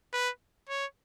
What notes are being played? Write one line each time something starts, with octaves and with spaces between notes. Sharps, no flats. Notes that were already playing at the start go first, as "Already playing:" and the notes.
B4
C#5